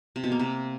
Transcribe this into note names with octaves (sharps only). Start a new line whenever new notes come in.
C3
B2
A#3
C3